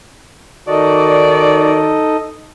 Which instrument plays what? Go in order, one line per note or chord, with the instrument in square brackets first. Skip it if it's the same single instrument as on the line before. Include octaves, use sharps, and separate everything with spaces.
[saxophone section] D#3 F#4 D5 [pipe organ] D#4 A4 D#5